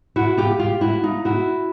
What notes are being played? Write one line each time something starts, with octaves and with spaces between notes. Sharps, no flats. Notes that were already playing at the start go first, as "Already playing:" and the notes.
E4 F#4
F4 G4
F4 G4
E4 F#4
D#4 F4
E4 F#4